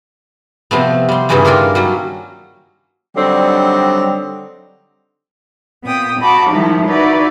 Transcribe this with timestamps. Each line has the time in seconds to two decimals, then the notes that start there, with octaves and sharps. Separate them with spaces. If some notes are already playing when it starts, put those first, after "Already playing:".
0.71 C3 F3 A3 B3
1.09 G3 C6
1.29 G2 C#3 E3 G3 G#3 D#4
1.45 D#3 A#3 D4 F4 A#4
1.75 F#3 G3 C#4
3.16 D3 F#3 G3 C4 D#4
5.85 A#2 B3 C4 G5 D#6
6.19 F#4 D#5 A5 B5 D6
6.50 D#3 F3 G3 G#3 D#4 E4
6.86 D#4 E4 F#4 B4 D5